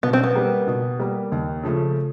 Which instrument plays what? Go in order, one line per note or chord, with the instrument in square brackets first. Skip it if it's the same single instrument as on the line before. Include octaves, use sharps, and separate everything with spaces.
[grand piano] B2 [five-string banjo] B3
[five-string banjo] C4
B3
[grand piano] G3 A#3
B2
G3 A#3
D#2
C#3 F3 A3 C#4